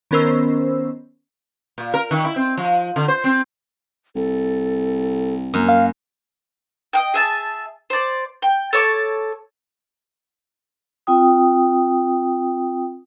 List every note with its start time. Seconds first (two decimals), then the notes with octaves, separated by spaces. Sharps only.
0.11 D#3 B3 C#4 A#4 C5 E6
1.78 A#2
1.94 A#4
2.11 D#3
2.24 E4
2.36 C4
2.57 F3
2.96 D3
3.08 C5
3.24 C4
4.15 C2 A4
5.54 F#2 A#3
5.69 F5
6.93 D#5 F5 G5
7.14 G#4 E5 A5
7.90 C5 D5
8.42 G5
8.73 A4 C#5 A5 D6
11.07 C4 F4 G5 D#6